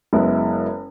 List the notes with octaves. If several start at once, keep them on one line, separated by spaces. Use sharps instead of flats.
F#1 G#3 B3 E4